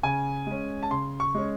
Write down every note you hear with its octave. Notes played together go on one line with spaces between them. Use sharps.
C#3 G#5
G#3 C#4
A5
C#3 C6
C#6
G#3 C#4